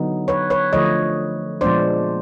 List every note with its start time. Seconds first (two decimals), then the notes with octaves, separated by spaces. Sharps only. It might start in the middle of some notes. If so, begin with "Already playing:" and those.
Already playing: D3 F#3 B3 D#4
0.28 B4 C#5
0.50 B4 C#5
0.73 D3 F3 A3 C#5 D#5
1.61 A#2 F3 G#3 B3 D4 C5 D5